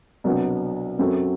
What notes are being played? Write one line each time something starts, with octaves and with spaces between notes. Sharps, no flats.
C2 B2 F#3 B3 D4
F#2 F#3 C4 F#4 A4